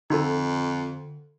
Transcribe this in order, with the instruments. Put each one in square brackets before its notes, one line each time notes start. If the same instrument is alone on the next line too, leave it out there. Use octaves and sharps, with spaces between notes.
[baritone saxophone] F2 [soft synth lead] D3 [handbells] D#4 F4 A4